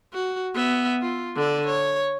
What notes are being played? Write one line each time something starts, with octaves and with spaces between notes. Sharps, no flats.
F#4
B3 E5
F4
D3 D5
C#5